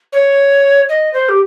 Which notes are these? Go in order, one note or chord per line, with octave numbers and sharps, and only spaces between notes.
C#5
D#5
C5
G4